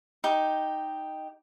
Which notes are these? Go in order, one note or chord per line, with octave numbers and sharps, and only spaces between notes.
D#4 G4